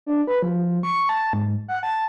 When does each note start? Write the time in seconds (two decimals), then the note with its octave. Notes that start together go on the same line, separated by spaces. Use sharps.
0.06 D4
0.27 B4
0.42 F3
0.83 C#6
1.09 A5
1.33 G#2
1.68 F#5
1.83 A5